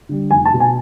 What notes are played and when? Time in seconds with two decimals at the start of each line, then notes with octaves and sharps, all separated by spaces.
0.09 D3 G3
0.31 F1 G#5
0.45 A5
0.53 B2
0.60 G#5